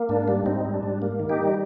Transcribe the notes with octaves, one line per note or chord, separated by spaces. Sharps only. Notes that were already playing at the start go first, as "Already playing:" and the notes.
Already playing: A#3
G#2 D4
G3 D4
G#2 C4 D#4
G3
D4
G#2
A#3
D#3
D#4 G4
G3